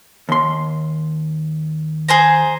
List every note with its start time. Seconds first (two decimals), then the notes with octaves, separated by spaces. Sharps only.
0.29 D#2 C6
2.08 G#4 C5 A#5